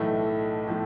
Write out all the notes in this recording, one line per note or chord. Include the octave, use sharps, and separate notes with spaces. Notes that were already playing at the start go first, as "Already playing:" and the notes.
Already playing: B1 A2 E3 A3
A2 F3 A3